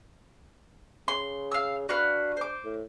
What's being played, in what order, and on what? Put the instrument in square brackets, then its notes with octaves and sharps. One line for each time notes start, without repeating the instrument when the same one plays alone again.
[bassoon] C#3 [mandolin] C6
[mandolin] F5 E6
[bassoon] D4 [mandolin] F#4 B4 F5
[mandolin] C5 D6
[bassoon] A2